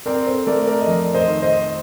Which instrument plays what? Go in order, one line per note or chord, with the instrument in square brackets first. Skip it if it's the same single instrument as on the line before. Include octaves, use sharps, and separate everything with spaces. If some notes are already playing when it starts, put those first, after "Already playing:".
[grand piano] C4 [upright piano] A#4 D5
[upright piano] A4 C5
[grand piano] A3 [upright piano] A#4 D5
[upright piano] A#4 D5
D#5
[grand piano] F2 [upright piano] A#4 D5
[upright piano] C5 D#5
[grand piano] D#3
[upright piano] C5 D#5